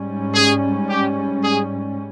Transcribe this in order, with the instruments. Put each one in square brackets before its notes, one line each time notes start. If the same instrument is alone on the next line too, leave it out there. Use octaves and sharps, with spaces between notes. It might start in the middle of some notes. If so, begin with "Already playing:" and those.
Already playing: [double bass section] G#2 G3 C#4
[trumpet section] G#4
G4
G#4